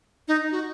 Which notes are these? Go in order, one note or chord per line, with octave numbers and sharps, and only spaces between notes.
D#4
F#4